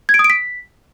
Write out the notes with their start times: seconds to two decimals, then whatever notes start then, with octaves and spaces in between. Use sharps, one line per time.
0.09 G#6
0.14 D7
0.19 D#6
0.24 D7
0.30 B6